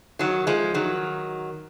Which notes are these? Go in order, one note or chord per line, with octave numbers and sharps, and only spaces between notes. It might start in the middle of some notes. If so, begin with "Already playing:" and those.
D#3 F#3
F3 G#3
D#3 F#3